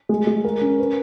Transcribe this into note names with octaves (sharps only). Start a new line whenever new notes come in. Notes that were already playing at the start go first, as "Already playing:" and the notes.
G#3
G#3
A#4
C#4
B4